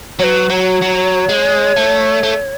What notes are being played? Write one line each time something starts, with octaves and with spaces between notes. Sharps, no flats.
F#3 B4 C#5
F#3 C#5
F#3
G#3
A3
A3